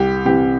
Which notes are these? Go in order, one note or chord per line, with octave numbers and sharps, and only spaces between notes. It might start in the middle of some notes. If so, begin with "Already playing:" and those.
Already playing: C2 G4
C3 E3 G4